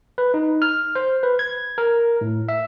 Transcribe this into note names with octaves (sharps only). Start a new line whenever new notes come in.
B4
D#4
F6
C5
B4
G#6
A#4
A2
E5